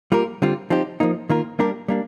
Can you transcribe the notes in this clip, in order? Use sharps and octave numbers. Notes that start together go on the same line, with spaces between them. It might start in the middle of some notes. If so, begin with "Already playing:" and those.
G3 A#3 F4 A#4
D3 G3 C4 F4
F3 C4 D#4 G4
F3 A#3 D#4
D#3 A#3 F4 A#4
G3 A#3 D4 G4 A#4
G3 A#3 D4